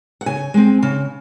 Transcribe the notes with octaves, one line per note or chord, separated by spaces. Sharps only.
F#5
C#3 G#5
G#3 C4
C#3